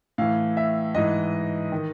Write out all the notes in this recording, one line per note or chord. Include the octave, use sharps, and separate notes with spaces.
A2 E3 F5
E5
G#2 E3 D#5
D#3